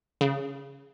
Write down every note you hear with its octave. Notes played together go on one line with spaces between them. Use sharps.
C#3